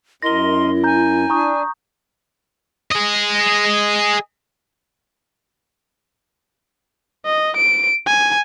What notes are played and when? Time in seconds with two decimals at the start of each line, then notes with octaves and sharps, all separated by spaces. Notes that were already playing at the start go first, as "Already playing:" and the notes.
0.22 F#2 E4 A#4 D#5 C6 A#6 G7
0.84 G#5 A#5 G6
1.30 D4 A#5 C#6 D#6
2.91 G#4 D#5
7.25 D#5
7.57 D7
8.07 G#5